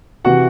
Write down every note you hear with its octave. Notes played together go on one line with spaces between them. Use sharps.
C3 E3 F#4 F#5